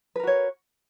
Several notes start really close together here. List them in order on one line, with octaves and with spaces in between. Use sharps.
B4 A#4 F#4 C#5